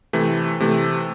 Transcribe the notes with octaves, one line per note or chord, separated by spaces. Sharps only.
C3 E3 A3
C3 E3 A3